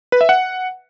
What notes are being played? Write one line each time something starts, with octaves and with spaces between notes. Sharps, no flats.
B4
E5
F#5